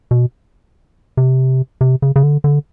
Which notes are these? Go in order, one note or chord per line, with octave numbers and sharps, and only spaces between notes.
B2
C3
C3
C#3
C#3
D3
D3